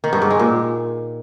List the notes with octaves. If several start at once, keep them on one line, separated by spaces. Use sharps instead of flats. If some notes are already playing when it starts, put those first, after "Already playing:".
D#3
G2
G#2
G#3
A#2